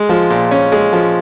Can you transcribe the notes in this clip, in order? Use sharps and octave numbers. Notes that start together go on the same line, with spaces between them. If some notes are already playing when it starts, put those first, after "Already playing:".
Already playing: G#3
F3
A#2
C#4
G#3
F3